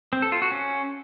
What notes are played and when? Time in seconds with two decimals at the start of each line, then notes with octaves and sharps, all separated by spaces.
0.13 C4
0.22 A4
0.32 F4
0.42 F#4
0.52 C#4